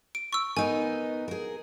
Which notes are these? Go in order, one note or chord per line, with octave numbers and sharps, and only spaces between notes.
D7
C#6 E6
B3 D#4 A#4 G#5
G#4 A#4